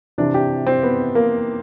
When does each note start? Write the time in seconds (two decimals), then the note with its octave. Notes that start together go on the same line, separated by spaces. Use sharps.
0.18 C3 E3 D4
0.34 G4
0.67 C4
0.83 B3
1.15 A#3